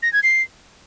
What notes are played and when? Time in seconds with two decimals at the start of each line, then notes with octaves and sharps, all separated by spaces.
0.03 A#6
0.13 G#6
0.23 C7